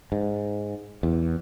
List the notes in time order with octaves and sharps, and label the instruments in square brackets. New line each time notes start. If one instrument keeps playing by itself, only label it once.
[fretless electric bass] G#2
E2